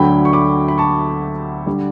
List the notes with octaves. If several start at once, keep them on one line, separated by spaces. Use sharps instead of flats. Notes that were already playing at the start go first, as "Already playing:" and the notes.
Already playing: D2 D3 F#3 A3 G5 B5
C#6
B5 D6
B5
A5 C#6
D3 G3